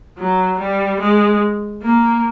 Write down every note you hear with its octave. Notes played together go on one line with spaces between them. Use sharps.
F#3
G3
G#3
A#3